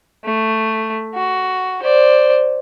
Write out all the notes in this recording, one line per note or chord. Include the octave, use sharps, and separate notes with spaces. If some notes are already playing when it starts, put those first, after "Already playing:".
A3
F#4
C5 D5